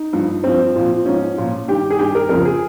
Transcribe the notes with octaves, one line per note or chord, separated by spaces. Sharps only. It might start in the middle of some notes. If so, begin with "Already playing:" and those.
Already playing: D#4
G2 F3
G2 F3 C4
A#2 F3
G#2 F3 C#4
A#2 F3
G2 D#3 G4
G#4
G2 D#3 G4
A#4
F2 C#3 F3 A#4
G#4